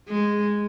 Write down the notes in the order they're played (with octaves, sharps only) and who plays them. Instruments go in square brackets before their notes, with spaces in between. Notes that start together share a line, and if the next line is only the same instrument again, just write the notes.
[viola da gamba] G#3